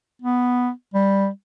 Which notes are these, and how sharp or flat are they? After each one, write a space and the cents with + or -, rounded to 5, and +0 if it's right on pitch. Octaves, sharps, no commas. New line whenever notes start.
B3 +0
G3 +5